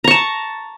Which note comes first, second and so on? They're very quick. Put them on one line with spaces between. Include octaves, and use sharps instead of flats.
A#5 C#6 A5